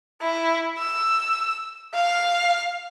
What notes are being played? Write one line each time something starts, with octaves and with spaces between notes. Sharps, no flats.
E4
E6
F5